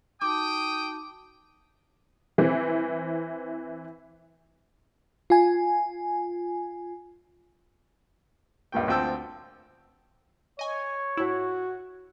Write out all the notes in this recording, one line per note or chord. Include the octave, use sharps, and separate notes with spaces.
D#4 F#4 G5 A5 D6 D#6
E3 C4
F4 G#5
C#2 G2 A#2 G5
D2 C4 F4 G5 A5 E6
C#5 D#5 G#5
A2 E4 F#4